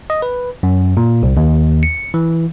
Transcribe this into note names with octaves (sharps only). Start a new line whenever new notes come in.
D#5
B4
F#2
A#2
C2
D#2
C#7
E3